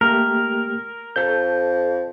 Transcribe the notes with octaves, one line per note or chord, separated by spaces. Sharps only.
A3 A#3 G4 A#4
F2 A4 G6